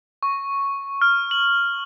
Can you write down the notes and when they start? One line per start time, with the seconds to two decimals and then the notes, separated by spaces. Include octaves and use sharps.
0.23 C#6
1.02 F6
1.31 F#7